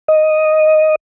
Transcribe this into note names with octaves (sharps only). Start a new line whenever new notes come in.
D#5